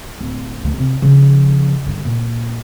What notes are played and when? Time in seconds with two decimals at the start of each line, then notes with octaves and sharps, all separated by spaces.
0.21 D1
0.63 D2 F3
0.78 C3
1.02 C#3 F3
1.86 G2 D3
2.05 A#2